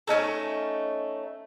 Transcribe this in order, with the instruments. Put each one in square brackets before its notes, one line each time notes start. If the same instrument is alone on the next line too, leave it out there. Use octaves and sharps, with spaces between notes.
[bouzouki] A3 C#4 D#4 A4